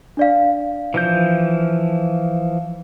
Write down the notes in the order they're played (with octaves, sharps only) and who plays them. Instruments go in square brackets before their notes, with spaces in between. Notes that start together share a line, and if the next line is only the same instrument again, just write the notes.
[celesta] D4 D5 F5
[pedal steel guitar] E3 F3 G6